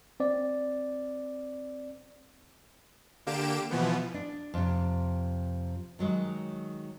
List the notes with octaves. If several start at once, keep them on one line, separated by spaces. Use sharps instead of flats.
C4 D5
D3 A#3 G4 D7 E7
B2 E3 F3 B3
D4
F2 C3
D#3 F#3 G#3